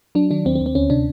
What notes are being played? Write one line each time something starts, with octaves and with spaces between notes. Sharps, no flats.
F#3 D4
D#3 D4
D#2 C4
C4
D#2
C4
D2 C#4
C3 D4